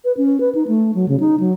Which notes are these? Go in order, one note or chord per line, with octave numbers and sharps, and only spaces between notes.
B4
C#4
B4
D#4
A3
F#3
C#3
D#4
F#3